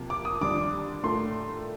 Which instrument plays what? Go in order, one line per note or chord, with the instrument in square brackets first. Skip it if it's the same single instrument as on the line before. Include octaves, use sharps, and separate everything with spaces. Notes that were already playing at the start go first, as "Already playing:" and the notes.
Already playing: [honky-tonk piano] C3 F3 A#3
[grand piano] D6
D#6
[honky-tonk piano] D#2 D3 G3 D4 F4 [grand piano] D6
[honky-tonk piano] A2 A3 D4 F4 A#4 [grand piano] C6